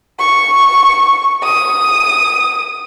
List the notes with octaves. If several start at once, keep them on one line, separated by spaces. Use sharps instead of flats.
C#6
D#6